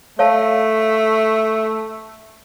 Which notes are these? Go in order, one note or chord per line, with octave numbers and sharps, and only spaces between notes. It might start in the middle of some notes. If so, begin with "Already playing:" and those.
A3 C#5 F5 A5